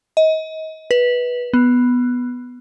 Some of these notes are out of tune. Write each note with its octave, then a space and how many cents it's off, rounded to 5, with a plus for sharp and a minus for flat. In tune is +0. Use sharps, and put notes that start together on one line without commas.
D#5 +30
B4 -15
B3 +0